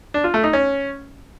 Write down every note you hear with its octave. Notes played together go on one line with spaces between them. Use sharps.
D4
F4
A3
D#4
C#4